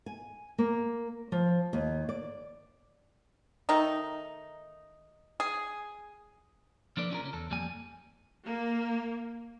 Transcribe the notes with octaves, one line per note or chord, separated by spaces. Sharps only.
G#5
A#3
F3
D#2
D5
D#3 A3 D#4
G#4
F3 A#3 D4 A4 B4 D5
C#4 D4 F4 G4 G#4 A#4
C#3 A#3 C#4
E2 A4
F2 G3 A#3 G#5
A#3